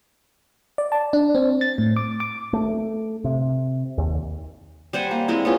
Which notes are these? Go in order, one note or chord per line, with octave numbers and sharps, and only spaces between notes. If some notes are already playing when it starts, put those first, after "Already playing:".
D5
A5
D4
C4
A6
A2
D6
D6
A3
C3
D#2
G3 C5 F#5 G#5
A#3
G#3 C4 E4
B3 C#4 F4 G#4